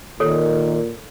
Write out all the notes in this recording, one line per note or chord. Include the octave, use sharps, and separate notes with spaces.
A#2 D#3 A4 A#4 C#5